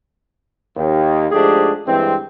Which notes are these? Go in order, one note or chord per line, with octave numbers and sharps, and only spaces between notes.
D#2
G#2 F3 A3 D4 G4 G#4
G2 E3 G#3 C4